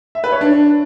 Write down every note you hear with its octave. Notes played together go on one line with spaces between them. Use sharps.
E5
B4
C#5
D4